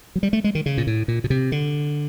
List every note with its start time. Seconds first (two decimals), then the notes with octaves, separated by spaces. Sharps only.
0.16 F#3
0.23 G3
0.33 A3
0.44 G#3
0.55 D#3
0.66 C#3
0.78 A#2
0.87 A2
1.08 A#2
1.24 B2
1.30 C3
1.52 D3